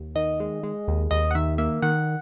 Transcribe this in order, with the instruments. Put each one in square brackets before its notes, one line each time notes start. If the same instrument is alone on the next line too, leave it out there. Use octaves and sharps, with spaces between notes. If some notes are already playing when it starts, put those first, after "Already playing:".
Already playing: [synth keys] D#2
D#3 D#5
G#3
G#3
D#2
D#2 D#5
F#5
D#3 E5
A#3 E5
D#3 F#5